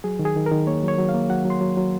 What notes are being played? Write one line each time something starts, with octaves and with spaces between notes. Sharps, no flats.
F#3 G#4
D#3
G#4
D#3
A#4
D#3
A#3 C#5
F#3
C#5
F#3
F5
A#3
F#3 F#5
F#3
C6
F#3
F#3